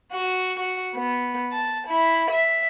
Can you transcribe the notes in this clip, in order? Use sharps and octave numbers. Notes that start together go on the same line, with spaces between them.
F#4
F#4
B3
A5
E4
E5